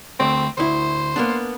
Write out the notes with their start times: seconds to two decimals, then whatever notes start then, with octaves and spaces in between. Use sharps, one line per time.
0.20 D2 A3 C4 D5
0.58 D2 E4 C5
1.16 A#3 B3 D4